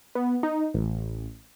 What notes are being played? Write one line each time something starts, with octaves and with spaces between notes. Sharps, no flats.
B3
D#4
A1